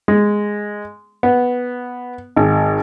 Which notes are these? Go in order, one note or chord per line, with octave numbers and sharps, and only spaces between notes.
G#3
B3
G#1